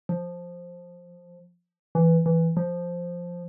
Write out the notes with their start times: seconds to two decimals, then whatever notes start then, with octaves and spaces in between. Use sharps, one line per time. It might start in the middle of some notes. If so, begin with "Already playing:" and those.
0.09 F3
1.95 E3
2.26 E3
2.57 F3